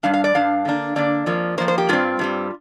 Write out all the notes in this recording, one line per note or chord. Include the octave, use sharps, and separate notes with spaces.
G2 G3 D4 F5
F5
D5
G2 G3 D4 F5
D3 A#3 D4
D3 A#3 D4 D5
F2 F3 A#3
F2 F3 A#3 C5
C5
G4
G2 G3 C4 F4
G2 G3 C4